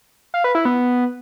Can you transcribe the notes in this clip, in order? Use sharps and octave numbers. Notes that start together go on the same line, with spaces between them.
F5
B4
E4
B3